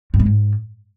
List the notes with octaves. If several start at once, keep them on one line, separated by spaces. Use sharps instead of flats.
G2
G#3
G#2